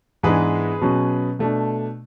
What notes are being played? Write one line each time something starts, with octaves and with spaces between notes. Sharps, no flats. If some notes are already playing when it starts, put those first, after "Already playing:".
G#2 E3 G#3 B3 D4 G#4 B4
B2 F#3 C#4
B2 A3 D4